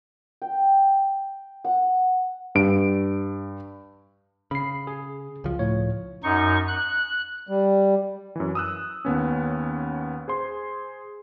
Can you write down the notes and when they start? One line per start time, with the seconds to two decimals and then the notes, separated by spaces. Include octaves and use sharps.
0.42 G5
1.65 F#5
2.55 G2 D7
4.51 C#3 B5 C7
4.87 G#4
5.44 C#2 F3
5.59 A2 C#5
6.23 F#2 D#4 C#6
6.68 F#6
7.48 G3
8.36 F#2 E3
8.55 D#6 E6 F#6
9.05 D#2 B3 C#4
10.28 G#4 C5 C6